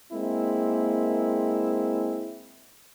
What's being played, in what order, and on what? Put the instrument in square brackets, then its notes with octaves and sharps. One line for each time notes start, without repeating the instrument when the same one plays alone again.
[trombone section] G#3 A#3 C4 E4